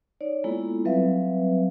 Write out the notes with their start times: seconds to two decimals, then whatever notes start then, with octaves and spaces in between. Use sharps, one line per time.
0.21 D#4 C#5 D5
0.44 G#3 A#3 B3 E4 F4 A4
0.85 F#3 G3 C4 B4 E5 F5